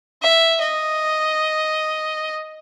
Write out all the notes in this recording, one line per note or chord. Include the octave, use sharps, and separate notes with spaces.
E5
D#5